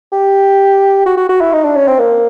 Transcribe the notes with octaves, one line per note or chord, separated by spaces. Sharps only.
G4
F#4
F#4
F#4
E4
D#4
D4
C#4
C4
A#3